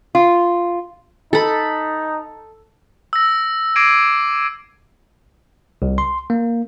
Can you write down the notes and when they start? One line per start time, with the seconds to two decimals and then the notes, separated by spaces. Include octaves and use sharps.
0.15 F4
1.33 D#4 A4 B5
3.13 E6 A#6
3.76 D6 G#6 A#6 C7 D7 D#7
5.82 C2
5.98 C6
6.30 A#3